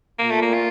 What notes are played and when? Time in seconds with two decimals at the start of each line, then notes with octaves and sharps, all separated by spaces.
0.19 A#2 A#3
0.31 A3
0.42 A#3
0.54 F4